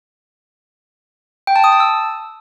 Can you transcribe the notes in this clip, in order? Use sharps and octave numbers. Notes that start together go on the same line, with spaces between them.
G5
A5
D#6
A5
E6